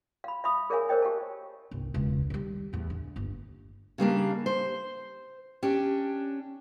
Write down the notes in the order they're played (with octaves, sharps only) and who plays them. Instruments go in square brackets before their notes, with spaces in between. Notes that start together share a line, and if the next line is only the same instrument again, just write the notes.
[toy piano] F5 B5
E5 F5 B5 D#6
G#4 A#4 C#5 E5 F5 G#5
A#4 C5 C#5 D#5 G5
G4 F5 G5 A5
[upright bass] G1 C2
E1 C#2
D#3 G3
E2 A2
D3
G1 D#2
[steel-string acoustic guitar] C#3 G3 A#3 D4
C5
C#4 D4 G4